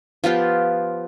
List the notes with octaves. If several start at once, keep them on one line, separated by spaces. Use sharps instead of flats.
F3 B3 F4 G4